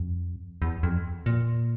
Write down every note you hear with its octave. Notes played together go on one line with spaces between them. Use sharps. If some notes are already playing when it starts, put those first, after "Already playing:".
Already playing: F2
E2
F2
A#2